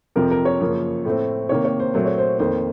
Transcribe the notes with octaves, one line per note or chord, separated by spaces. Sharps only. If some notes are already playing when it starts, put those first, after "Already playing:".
F2 C3 F3 A#4
A#4
C#5
F#2 C#3 F3 A#3
A2 A3 C4
C3 D#3 A#3 C#5
C#5
C5
A#2 F#3 A3 C4 C5
C#5
C5
F2 D#3 A#3 C5